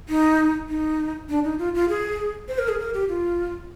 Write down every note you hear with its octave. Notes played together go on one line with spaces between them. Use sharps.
D#4
D#4
D4
D#4
F4
F4
G#4
C5
A#4
G#4
A#4
G4
F4